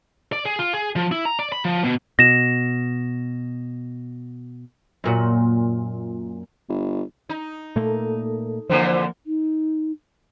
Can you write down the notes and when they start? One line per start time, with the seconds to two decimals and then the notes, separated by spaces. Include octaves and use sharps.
0.33 D5
0.45 G#4
0.59 F4
0.73 G#4
0.96 F3
1.12 E4
1.25 A#5
1.39 D5
1.52 B5
1.65 F3
1.84 B2
2.19 B2 A#6 E7
5.04 F#2 A#2 F#4
6.69 G1
7.29 D#4
7.76 A#2 A3 A#3 A4
8.70 F2 D3 E3 F3 A#3 C5
9.26 D#4